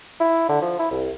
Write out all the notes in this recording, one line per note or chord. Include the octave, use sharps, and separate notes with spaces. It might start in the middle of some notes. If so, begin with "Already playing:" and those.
E4
D3
F3
E4
C2